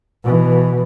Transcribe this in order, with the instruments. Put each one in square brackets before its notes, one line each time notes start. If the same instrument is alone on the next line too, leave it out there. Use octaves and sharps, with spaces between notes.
[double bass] B2 E3